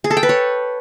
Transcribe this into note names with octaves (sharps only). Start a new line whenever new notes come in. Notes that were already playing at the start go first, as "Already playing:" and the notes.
G#4
A4
G5
B4
C#5